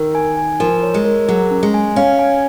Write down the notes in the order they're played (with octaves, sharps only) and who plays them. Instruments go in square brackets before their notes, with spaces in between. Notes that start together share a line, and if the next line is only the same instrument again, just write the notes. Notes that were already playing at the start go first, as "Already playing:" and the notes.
Already playing: [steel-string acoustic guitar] D#3 [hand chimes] A#4
[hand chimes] G#5
G#5
[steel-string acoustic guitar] F3 [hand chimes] A#4
[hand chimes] C#5
[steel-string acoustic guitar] G#3
[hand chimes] A#4
[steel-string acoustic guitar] F#3 [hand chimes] G#4
[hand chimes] C#4
[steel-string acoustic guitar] G#3
[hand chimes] G#5
[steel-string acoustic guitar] C#4 [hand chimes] F5
[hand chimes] G#5